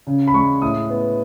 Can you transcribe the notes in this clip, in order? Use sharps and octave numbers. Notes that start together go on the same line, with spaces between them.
C#3
B5
G#3 C#6
A2 D#6
B3